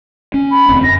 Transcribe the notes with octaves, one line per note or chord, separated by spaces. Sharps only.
C#4
B5
E1 D2 C4
F#2 A#6